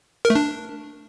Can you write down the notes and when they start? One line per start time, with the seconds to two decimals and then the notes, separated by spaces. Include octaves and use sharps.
0.25 A#4
0.30 A3
0.35 D4